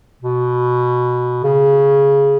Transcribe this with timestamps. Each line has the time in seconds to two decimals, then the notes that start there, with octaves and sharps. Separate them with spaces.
0.23 B2
1.44 C#3